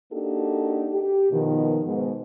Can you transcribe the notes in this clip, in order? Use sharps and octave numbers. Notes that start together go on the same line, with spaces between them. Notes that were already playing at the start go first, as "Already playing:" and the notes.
A#3 D4 D#4 F#4 G4 A4
G4
B2 D#3 F3
G#2 B2